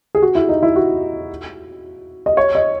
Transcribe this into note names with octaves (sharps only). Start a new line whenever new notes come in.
G#4
F#4
E4
D#4
E4
F#4
D#5
C#5
D#5